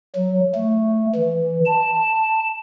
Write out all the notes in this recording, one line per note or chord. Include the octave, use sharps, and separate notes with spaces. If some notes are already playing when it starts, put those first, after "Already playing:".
F#3
A3
E3
A5